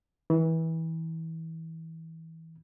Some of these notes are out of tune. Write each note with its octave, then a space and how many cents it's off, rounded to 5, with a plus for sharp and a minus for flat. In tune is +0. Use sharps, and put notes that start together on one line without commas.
E3 -25